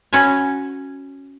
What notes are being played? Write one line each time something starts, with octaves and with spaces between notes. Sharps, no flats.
C#4 F#4 A4 B4 C#5